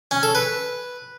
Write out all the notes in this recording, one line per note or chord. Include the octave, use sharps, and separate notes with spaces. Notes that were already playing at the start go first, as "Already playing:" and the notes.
C#4
A4
B4